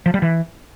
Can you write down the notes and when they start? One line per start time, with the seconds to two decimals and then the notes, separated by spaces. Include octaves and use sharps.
0.06 F3
0.14 G3
0.22 E3